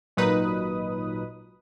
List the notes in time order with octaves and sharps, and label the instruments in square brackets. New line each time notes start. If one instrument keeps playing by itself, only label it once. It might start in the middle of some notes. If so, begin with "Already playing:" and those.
[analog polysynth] G#1 A#2 F#3 D#4 B4 D#6